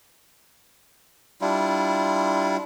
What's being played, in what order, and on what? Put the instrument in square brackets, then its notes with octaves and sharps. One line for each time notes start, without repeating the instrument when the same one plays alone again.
[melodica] G3 D4 E4 F4